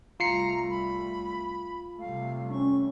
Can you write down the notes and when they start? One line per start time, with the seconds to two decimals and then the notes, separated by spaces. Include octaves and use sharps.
0.20 C2 G3 A3 F4 A#5 C7 C#7
0.70 B5
2.00 C3 G3 A3 F5
2.51 C#4 C#6